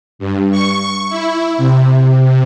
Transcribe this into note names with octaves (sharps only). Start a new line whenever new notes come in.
G2
C#6
E4
C3